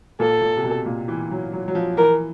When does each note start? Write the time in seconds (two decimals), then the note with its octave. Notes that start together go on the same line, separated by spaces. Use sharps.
0.20 A#2 A4
0.42 A#2
0.57 C3
0.64 B2
0.86 A#2
1.08 E3
1.31 F#3
1.53 F#3
1.68 F#3
1.75 F3
1.97 E3 A#4